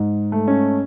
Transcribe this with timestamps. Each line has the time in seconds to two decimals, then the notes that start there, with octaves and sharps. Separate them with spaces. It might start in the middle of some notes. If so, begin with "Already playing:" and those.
Already playing: G#2
0.32 A3
0.48 C#4